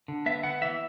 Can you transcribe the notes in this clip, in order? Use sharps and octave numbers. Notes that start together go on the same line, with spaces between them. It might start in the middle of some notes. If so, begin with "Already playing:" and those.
D3
B3 E5
B3 F#5
E3 E5